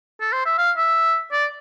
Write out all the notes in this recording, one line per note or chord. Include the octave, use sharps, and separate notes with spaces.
A4
C5
E5
F5
E5
D5